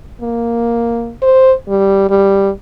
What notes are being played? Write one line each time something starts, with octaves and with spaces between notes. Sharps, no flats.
A#3
C5
G3
G3